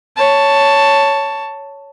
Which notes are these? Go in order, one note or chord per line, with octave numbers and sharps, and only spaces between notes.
C#5 A5